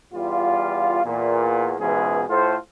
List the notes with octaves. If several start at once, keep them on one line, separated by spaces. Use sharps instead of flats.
E2 G3 F4
E2 A#2
C#2 G#2 B2 E3 G#4
A2 F4 A4 C5